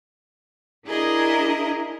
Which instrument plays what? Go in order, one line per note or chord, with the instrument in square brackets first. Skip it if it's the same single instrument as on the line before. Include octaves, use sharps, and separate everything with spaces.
[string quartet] D4 E4 G#4 A#4 D#5